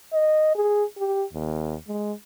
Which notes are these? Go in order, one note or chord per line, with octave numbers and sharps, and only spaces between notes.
D#5
G#4
G4
D#2
G#3